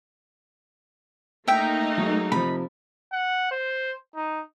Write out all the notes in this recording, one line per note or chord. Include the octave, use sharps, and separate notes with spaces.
A3 A#3 D#4 E5 G5
F#3 G#3
C3 F3 B5
F#5
C5
D#4